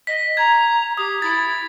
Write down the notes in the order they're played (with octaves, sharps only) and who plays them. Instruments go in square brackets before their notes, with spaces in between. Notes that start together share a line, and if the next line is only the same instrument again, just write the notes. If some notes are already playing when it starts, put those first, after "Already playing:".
[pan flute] D#5 [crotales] B6
[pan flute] A#5 [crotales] G#6
[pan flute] G4 [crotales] D#6
[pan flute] E4 [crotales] A6